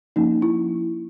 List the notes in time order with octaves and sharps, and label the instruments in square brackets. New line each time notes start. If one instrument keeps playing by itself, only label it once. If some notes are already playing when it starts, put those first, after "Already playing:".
[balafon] F3 A#3 C#4 D#4
E4